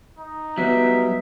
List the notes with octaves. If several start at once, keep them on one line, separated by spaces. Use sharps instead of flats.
D#4
F#3 G3 B3 E5